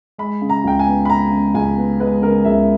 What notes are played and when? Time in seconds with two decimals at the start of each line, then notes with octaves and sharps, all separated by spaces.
0.18 G#3 B5
0.42 C#3
0.49 A#5
0.64 C#2 G5
0.79 G#5
0.87 B3
1.05 B5
1.09 G#3 A#5
1.31 C#3
1.54 C#2 G#5
1.77 B3
2.00 G#3 B4
2.22 C#3 A#4
2.44 C#2 E5